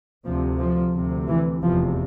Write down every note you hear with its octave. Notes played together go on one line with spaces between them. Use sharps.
D2 C3 F3
F3
D2 C3
E3
F1 E2 C3 F3